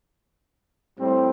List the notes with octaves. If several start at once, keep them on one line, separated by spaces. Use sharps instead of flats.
A2 G3 C4